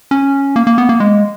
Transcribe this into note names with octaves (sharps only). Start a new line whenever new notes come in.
C#4
A#3
A#3
B3
A#3
G#3